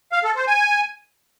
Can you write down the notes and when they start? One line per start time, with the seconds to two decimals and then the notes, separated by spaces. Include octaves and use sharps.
0.12 F5
0.24 A4
0.35 C5
0.47 G#5